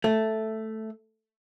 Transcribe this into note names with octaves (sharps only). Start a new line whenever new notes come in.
A3